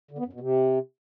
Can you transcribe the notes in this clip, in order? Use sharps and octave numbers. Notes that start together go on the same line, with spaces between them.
D3
B3
F#2
B2
C3